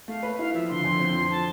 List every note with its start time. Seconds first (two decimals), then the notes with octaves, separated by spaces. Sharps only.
0.08 A3 F5
0.23 B4
0.39 E4 F5
0.54 F3 E5
0.69 D3 C6
0.84 F2
1.00 C4
1.14 F3
1.31 A5